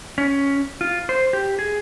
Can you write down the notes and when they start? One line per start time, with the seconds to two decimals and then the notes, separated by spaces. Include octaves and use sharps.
0.18 C#4
0.81 F4
1.09 C5
1.33 G4
1.59 G#4